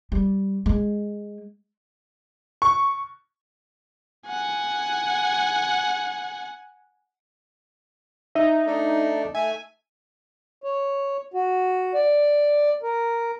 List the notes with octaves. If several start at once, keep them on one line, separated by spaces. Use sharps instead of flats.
G3
G#3
C#6
F#5 G#5
D#4 E5
A3 D4 A4
A3 E5 G#5
C#5
F#4
D5
A#4